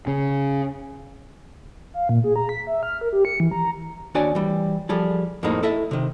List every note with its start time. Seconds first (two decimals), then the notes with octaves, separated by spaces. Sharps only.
0.07 C#3
1.94 F5
2.09 A#2
2.24 G#4
2.36 A#5
2.49 B6
2.67 E5
2.83 F6
3.01 A#4
3.13 G4
3.25 C#7
3.40 E3
3.51 A#5
4.15 D#2 D4 F#4 C#5 D5 G#5
4.35 E3 G3
4.89 F3 G3 G#4 A4
5.43 F2 A2 F3 G#3 A#3 D#4
5.63 E4 A4 D#5 E5
5.91 C3 D#3